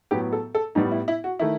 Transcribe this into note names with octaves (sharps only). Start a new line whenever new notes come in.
A2 F#3 B3 G4
A4
A4
A2 G3 B3 D#4
E4
E4
F#4
D#3 A3 E4